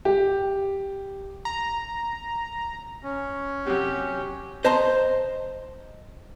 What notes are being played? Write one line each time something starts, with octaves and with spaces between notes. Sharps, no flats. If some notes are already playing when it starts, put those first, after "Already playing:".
G4
A#5
C#4
C3 F#3 G4
C5 D#5 A5 A#5 C6